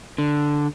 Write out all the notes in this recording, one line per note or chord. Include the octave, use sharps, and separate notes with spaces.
D3